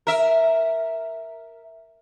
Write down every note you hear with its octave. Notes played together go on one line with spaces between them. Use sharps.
A#4 E5